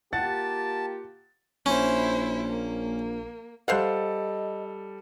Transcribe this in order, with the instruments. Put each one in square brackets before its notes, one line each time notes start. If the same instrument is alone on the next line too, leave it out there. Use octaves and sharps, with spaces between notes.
[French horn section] A#3 F4 G4 [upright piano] F#5 A6 [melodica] A5
[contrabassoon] A#1 [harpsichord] C#4 [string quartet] E4 C5
[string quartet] A#3
[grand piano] G3 A4 [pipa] C5 F5 F#5 [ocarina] D#5